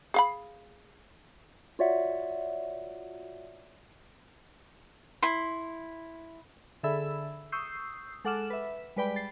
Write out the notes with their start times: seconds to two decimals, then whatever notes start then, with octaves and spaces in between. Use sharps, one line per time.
0.14 G#4 F5 B5
1.79 F4 F#4 C#5 D5 E5 F#5
5.22 E4 C6
6.83 D3 G#4 A4 E5 B5 E6
7.52 C#6 D#6 E6 G6 C7
8.24 G#3 A4 F#5 D6 F6 E7
8.50 B4 E5
8.96 G3 G#3 B4 D5 G5 B5
9.16 A6 C7